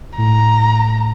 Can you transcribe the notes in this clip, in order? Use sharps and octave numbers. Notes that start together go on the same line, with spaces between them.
A2 A#5